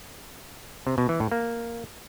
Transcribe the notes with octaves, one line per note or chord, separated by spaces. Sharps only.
C3
B2
E3
A2
A#3